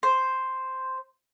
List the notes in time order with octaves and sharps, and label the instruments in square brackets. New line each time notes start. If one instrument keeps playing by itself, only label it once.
[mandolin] C5